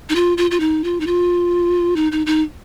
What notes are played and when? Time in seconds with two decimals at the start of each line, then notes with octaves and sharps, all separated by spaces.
0.09 D#4
0.16 F4
0.38 F4
0.51 F4
0.60 D#4
0.84 F4
1.00 D#4
1.07 F4
1.96 D#4
2.12 D#4
2.26 D#4